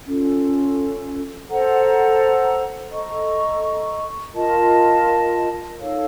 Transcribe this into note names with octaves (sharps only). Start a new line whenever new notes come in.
C#4 F4 A4
A4 C5 F#5 A#5
A4 D#5 A#5 C#6
F4 A#4 D#5 A5
D#4 A4 C#5 F5